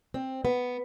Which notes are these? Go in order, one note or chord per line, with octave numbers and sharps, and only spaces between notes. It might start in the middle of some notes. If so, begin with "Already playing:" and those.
C4
B3